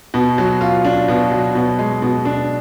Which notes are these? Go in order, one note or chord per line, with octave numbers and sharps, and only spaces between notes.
B2
F#3
F4
D4
B2
F#3
B2
G#3
B2
D4